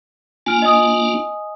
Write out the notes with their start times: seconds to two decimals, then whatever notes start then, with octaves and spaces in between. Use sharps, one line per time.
0.46 A#3 D4 F4 G#5 F6
0.62 D#5 G#5 D#6